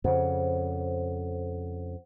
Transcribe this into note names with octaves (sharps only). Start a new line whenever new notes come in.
F2 C#3 C5 F#5